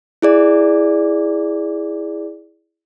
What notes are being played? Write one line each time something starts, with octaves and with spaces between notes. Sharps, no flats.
E4 G#4 D5